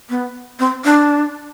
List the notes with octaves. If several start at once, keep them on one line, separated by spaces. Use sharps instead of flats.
B3
C4
D4